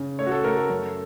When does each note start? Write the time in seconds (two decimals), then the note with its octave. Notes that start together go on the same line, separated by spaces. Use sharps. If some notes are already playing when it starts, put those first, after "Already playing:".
Already playing: C#3
0.19 A3 C#5
0.26 F#4
0.32 A4
0.44 A3 A#4
0.57 A4
0.70 F#2